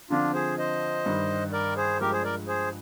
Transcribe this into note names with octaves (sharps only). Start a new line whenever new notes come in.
D3 F3 C4 D4 F4
G#4 C5
C5 D#5
G2 D#3 G3
A#4 D5
G#4 C5
G2 F3 G#3 G4 A#4
G#4 C5
A#4 D5
G#4 C5